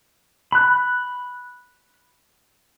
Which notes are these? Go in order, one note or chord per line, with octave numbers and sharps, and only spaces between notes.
B5 F#6